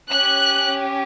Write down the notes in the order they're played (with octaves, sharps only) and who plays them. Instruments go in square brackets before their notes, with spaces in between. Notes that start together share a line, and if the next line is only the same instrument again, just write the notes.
[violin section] C#4 G4 F#6